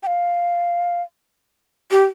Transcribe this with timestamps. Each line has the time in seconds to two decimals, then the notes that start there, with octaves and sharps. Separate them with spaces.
0.03 G5
0.07 F5
1.91 G4